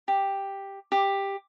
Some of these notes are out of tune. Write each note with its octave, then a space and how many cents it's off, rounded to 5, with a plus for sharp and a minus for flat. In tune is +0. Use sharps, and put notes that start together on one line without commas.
G4 +5
G4 +10